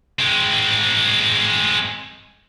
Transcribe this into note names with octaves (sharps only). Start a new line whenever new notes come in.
G#3 C4